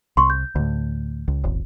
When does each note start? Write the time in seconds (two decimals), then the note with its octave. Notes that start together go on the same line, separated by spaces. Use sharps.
0.17 C2 C6 C#6
0.30 G6
0.56 D2 A2
1.28 C#2
1.44 D#1 G#1